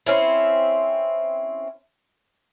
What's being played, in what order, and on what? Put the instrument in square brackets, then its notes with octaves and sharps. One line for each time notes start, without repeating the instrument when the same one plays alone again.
[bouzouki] C4 C#4 E4